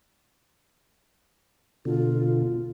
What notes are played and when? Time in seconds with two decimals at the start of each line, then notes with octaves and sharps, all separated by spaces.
1.85 B2 D3 F4